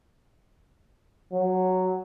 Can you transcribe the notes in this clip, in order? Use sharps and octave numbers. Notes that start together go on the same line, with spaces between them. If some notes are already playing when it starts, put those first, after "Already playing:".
F#3